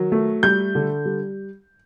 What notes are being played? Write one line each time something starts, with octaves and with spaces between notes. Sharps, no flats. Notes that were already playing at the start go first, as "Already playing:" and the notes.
Already playing: D#3 F#3
A3
G3 G6
D3
G3